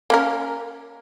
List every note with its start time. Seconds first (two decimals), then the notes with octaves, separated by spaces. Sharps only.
0.10 A#3 C#4 A#4